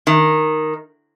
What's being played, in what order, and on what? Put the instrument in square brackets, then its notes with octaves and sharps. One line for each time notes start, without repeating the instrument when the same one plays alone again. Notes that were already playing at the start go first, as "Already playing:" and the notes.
[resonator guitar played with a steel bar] D#3